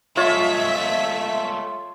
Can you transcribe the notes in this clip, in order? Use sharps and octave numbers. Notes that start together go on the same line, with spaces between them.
G#3 A3 F4 C#5 E5 B6